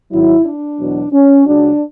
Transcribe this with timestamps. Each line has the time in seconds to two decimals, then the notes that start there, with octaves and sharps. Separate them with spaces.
0.12 G#1 G#2 F#3 E4
0.46 D4
0.79 E2 B2 F#3
1.13 C#4
1.46 C#2 C#3 F#3 D4